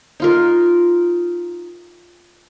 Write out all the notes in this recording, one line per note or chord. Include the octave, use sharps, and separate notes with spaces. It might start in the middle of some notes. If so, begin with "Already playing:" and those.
D#4 F4 A#4